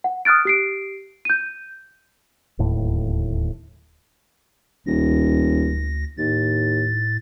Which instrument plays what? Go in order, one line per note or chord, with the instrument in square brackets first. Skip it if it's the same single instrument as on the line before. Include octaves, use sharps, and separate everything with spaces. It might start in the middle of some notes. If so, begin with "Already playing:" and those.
[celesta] F#5
D#6 F6 F#6 A6 D7
G4 C7 D7
G6 D#7
[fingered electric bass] D1 D#2 A2
[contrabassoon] D#1 [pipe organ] D2 A#6
[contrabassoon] D#2 [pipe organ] A2 A6